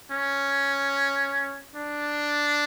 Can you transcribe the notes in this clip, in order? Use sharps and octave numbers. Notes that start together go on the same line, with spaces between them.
C#4
D4